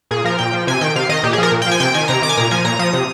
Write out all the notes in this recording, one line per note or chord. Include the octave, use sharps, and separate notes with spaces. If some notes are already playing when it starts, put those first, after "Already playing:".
A#2 G#4
F3 A#4
A#2 G5
F3
C3 G#5
D#3 G5
C3 F5
D#3 D#5
A#2 G4
G#4
F3 A#4
A#2
G5
F3 G#5
C3 G5
D#3 G#5
C3 A#5
D#3 D6
G#5
A#2 A#5
F3 G#5
A#2 A#5
F3 D#6
C3